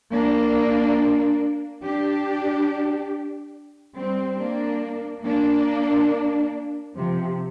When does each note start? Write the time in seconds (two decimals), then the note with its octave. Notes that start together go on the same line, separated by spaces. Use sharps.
0.13 A#3 D4
1.84 D4 G4
3.96 G3 C4
4.40 A#3 D4
5.25 A#3 D4
6.96 C3 F3